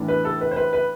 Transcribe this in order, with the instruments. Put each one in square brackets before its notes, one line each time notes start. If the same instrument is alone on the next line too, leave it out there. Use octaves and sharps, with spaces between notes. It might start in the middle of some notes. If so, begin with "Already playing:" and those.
Already playing: [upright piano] A2 E3 B3 D4
B4
A4
B4
C5
B4
B4